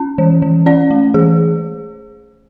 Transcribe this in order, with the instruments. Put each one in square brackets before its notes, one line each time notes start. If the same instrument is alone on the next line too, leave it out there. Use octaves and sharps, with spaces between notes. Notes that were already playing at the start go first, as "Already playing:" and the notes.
Already playing: [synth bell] C#4
E3
E3
C#4 D5
A3
E3 G#4